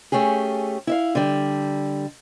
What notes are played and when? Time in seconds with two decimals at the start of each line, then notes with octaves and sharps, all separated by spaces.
0.12 A3 C#4 G4 G#4
0.87 E4 E5 F5
1.15 D3 G3